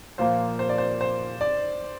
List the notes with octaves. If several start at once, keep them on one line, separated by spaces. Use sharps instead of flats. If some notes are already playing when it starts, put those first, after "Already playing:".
A#2 F3 A#3 C5
C5
D5
C5
C5
D5